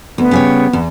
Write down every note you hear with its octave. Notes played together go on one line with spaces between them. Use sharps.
D2 B3
C#3 G3 C#5
E2